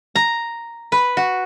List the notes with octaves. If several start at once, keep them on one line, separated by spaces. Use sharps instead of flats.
A#5
B4
F#4